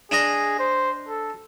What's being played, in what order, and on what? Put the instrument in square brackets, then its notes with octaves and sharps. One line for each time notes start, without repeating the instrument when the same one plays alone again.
[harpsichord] D4 D#5 A#5 [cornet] G#4
[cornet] C5
A4